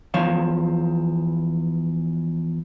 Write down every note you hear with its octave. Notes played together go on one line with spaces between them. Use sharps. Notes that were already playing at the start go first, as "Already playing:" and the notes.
E2 F3 C#5 F5